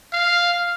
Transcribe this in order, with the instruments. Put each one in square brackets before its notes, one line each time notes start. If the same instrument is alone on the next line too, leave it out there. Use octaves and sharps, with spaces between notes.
[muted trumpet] F5